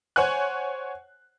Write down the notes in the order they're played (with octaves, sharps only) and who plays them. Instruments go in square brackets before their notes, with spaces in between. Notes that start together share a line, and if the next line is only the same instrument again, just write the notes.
[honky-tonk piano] C5 C#5 F#5 G#5 F#6